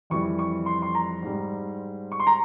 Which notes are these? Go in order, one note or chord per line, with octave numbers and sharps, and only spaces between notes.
F2 E3 G3 C#6
C#6
C6
C6
A#5
G#2 G3
C#6
C6
A#5